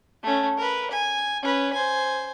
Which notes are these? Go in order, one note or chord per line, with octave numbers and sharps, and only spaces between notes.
A3 C#4
A#4 B4
G#5
C#4 B4
C5 G#5